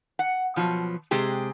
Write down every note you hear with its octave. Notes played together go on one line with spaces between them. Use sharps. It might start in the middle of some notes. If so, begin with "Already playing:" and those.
F#5
B2 F3 F#3
C3 G#3 G4 G#4